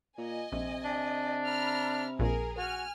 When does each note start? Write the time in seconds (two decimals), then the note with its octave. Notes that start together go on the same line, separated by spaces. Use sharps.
0.18 A#2 D#5 G#5
0.52 A#1 C3
0.85 D4
1.46 A#5 B5 F6
2.19 A#1 A#2 G#4 A#4
2.58 F#4 G#5 F6